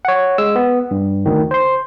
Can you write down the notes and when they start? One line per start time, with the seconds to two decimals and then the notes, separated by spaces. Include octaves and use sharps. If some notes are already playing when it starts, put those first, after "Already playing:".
0.05 C#5 F#5
0.38 G#3 E6
0.56 B3
0.91 G2
1.26 D2 D#3
1.51 C5 C6